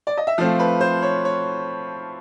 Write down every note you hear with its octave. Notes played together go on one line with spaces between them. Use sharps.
D5
D#5
E5
F3 A3 C4 F5
B4
C5
C#5
C#5